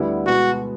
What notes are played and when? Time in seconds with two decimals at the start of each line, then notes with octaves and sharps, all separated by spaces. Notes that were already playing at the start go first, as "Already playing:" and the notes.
Already playing: D2 D3 G3 B3 E4
0.26 B2 G#3 B3 F#4